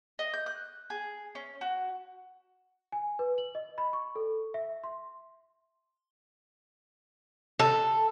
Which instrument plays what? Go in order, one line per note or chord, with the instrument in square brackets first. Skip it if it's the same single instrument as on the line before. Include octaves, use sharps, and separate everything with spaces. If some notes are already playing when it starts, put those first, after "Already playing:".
[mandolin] D#5
G6
F#6
G#4
C#4
F#4
[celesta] G#5
B4
F#7
D#5
B5
C#6
A4
E5
C6
[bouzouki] A4